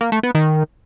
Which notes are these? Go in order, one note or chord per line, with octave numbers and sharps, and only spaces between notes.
A#3
A3
B3
D#3